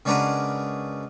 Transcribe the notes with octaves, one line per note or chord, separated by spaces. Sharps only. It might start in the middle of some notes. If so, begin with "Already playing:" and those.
C#3 G#3 D4 F#4 A#4 B4